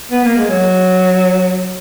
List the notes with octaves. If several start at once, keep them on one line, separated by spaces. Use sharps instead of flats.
B3
A#3
G#3
F#3